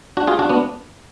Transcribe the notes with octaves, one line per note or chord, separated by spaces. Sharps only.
D4 F#4
F4 G#4
D4 F#4
B3 D4